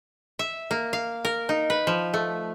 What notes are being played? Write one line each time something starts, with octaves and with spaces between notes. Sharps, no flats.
E5
A#3
F5
A#4
D#4
B4
F3
A3